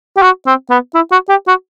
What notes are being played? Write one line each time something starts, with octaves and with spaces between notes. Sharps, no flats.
G4
F#4
C4
B3
E4
F#4
G4
F#4